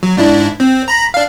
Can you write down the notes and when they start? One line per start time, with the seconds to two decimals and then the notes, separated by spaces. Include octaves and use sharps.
0.03 F#3
0.17 G#2 D4 E4
0.60 C4
0.88 A#5 B5
1.14 D4 F5